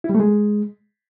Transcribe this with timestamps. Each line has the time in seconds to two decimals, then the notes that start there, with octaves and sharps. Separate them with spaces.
0.04 E4
0.09 G3
0.15 A3
0.20 G#3